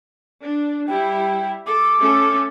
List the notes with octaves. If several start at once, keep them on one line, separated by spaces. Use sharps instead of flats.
D4
G3 E4 G4 G5
A4 D6
A3 C#4 A4